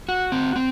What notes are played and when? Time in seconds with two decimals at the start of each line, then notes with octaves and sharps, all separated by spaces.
0.09 F#4
0.32 C4
0.56 C4